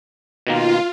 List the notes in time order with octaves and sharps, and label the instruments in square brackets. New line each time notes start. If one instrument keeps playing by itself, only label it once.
[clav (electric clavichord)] B2 D#3 A#3 [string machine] F4